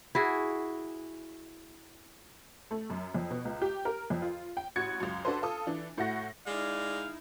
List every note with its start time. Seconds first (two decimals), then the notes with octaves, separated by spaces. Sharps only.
0.15 E4 F#4 G#4
2.71 A3
2.90 F#2
3.14 F2
3.30 B2
3.45 C#2
3.62 G4
3.85 A#4
4.10 F2
4.22 F4
4.57 G5
4.76 A1 F#4 G#6 C#7
5.00 C#2 F#2
5.25 D4 F#4 A4 B4 C5
5.42 F4 A4 D#6
5.67 E3 D4
5.97 A2 A3 F#4 F#5 A#6
6.47 G#3 D#4 E4 D5 F5